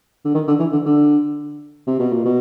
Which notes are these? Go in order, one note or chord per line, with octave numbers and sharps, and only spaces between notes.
D3
D#3
D3
E3
D3
D3
C3
B2
A#2
B2